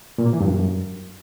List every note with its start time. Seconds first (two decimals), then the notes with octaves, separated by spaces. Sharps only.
0.18 A#2
0.26 A#3
0.33 E3
0.40 G2
0.48 F#2